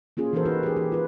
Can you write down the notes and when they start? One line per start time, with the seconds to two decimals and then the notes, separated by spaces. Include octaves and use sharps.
0.17 A#3 C#4 F4 G#4
0.33 E3 D#4 F#4 A4 A#4 C5
0.45 D#4 F#4 B4
0.63 G4 G#4
0.76 E3 G4
0.92 F4 B4